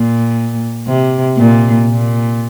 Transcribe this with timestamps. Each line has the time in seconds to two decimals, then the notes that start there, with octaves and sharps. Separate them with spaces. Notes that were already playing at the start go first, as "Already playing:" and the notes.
Already playing: A#2
0.88 C3
1.37 A#2
1.88 A#2